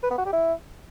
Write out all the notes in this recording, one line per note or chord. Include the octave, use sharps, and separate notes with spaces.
B4
B3
F#4
G4
E4